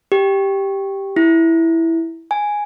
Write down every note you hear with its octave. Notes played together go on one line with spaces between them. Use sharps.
G4
E4
G#5